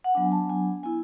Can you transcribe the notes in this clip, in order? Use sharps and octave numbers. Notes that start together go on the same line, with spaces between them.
F#5
F#3 B3 D4 G#5
G#5
A5
G#5
B3 E4 G#5